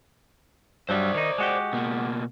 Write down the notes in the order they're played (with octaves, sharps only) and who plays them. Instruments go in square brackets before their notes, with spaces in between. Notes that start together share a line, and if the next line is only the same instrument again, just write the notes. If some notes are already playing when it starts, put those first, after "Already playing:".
[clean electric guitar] G2 F#3 G3 [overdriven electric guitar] C5 D5
[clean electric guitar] D#3 D#4
G#3 F#4 G4
[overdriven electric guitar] B2 A#3